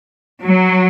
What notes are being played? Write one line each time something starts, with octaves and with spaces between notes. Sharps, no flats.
F#3